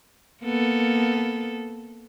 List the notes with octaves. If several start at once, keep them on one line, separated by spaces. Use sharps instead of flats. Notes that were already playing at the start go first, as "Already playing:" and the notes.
A#3 B3 A4